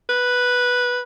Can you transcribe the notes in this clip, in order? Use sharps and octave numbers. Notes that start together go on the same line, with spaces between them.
B4